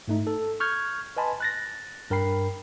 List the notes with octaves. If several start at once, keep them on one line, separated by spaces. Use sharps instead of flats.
G#2 A3 D#4
A4
C#6 F6 G6 G#6
B4 D#5 G#5 A5 B5 C6
F#6 A6 A#6
G2 A#4 G5 B5 C7